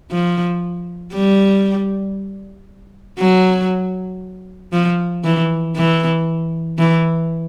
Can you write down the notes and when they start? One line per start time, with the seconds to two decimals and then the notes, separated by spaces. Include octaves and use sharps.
0.11 F3
1.13 G3
3.19 F#3
4.73 F3
5.24 E3
5.76 E3
6.78 E3